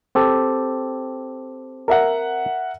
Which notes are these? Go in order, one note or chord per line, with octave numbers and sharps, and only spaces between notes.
C4 G4 A4
A#4 E5 F#5